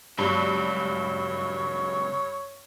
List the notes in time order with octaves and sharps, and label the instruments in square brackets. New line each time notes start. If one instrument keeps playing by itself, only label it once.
[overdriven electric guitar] C#2 F#3 [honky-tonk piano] G2 [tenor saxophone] C#5